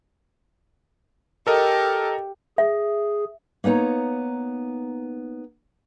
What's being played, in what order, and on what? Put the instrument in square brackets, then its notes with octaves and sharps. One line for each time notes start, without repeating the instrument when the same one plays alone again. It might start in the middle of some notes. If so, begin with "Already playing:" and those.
[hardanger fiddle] G4 [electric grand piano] A4 A#4 D#5
[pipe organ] G#4 [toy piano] E5
[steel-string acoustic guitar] A#3 B3 D#4 C#5 A#5